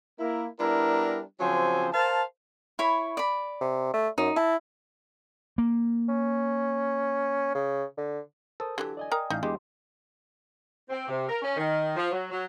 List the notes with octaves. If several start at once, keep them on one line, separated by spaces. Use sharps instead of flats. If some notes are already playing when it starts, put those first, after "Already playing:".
A#3 E4 A#4
G3 B3 D4 E4 A#4
C#3 F3 F#3 C4 C5 G#5
A#4 C5 F5 A5
E4 C#5 B5
D5 B5
C3
A3
F#2 D#4
E4 A5
A#3
C#4
C#3
D3
A4 A#4 C5 D#6
D3 E3 F#3 G4
D5 D#5 G#5
A#4 G5 A#5 D#6
A1 D#4 F5
E2 G#3 D4 G4 C6
C4
C3
A#4
C#4
D#3
F3
F#3
F#3